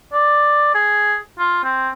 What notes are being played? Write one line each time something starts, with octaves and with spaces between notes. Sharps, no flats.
D5
G#4
F4
C4